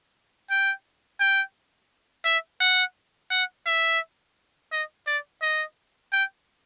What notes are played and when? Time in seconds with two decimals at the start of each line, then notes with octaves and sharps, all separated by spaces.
0.50 G5
1.20 G5
2.26 E5
2.61 F#5
3.31 F#5
3.67 E5
4.72 D#5
5.07 D5
5.42 D#5
6.13 G5